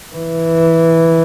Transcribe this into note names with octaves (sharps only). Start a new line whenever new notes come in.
E3